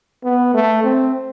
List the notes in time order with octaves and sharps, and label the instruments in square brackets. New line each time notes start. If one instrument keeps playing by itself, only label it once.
[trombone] B3
A3
C4